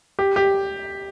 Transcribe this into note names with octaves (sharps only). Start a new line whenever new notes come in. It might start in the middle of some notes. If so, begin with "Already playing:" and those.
G4
G4